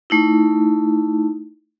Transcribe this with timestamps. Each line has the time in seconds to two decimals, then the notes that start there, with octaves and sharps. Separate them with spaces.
0.10 A3 D#4 E4